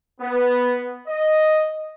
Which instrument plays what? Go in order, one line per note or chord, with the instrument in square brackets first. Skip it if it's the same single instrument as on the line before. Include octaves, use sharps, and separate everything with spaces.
[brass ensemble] B3
D#5